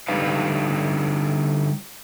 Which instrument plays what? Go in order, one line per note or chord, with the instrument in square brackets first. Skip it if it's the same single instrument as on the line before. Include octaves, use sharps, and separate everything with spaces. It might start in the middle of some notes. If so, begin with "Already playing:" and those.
[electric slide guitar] D3 G3 D#4 G4 B4 F5